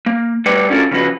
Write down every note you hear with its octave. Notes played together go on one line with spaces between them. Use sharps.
A#3
G3 A3 B4 D5 F#5 G5
C#4 D4 F4 F#4 A4 A#4
C#3 F3 F#4 B4